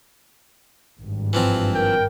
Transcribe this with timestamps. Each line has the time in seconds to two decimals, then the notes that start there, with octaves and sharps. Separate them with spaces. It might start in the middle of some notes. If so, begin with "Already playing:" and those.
1.00 G#1 G2
1.33 E3 F3 C4
1.74 A#4 G5